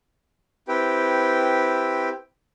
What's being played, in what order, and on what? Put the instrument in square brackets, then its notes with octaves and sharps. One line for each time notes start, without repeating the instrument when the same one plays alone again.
[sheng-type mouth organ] C4 E4 G4 B4 G5